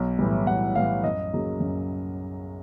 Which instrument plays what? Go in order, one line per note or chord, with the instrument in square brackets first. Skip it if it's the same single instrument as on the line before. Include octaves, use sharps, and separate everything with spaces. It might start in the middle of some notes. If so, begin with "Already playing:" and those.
Already playing: [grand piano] B1
A2 E3 G3
B1 F#5
A2 E3 G3 F5
F#2 D#5
C#3 F#3 A#3
F#2